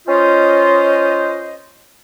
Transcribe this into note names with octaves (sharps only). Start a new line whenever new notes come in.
C#4 F4 C5 D#5